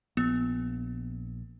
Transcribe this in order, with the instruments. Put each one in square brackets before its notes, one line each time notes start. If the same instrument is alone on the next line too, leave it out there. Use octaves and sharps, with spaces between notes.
[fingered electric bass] A#1 [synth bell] B3